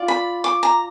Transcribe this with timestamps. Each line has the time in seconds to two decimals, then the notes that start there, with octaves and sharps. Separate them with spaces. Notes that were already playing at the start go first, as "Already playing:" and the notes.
Already playing: F4 D5
0.08 B5
0.44 D6
0.63 A#5